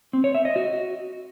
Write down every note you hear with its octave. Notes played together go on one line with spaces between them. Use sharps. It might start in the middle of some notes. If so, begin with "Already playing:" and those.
C4
C#5
E5
D#5
F#4